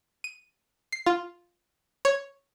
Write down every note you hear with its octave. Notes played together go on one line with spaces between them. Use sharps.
D#7
C7
F4
C#5